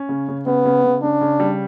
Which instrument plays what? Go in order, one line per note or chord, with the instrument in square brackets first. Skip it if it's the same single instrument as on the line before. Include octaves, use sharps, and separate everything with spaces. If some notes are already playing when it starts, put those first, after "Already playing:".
Already playing: [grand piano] C#4
C#3
C#3
[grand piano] C#3 [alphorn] B3
[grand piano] C#3
C#3
[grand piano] C#3 [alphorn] D4
[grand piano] C#3
G3